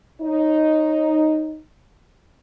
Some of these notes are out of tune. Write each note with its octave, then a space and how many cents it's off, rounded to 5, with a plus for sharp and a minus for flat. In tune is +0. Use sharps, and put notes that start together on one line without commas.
D#4 +0 C#5 -15